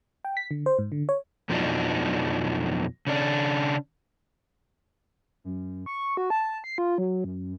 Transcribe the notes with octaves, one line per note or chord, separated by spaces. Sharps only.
G5
B6
D3
C5
G#2
D3
C#5
F2 B2 F3 F#3 D4 D#4
C#3 C#4 D4
F#2
C#6
F#4
A5
C7
F4
F#3
F#2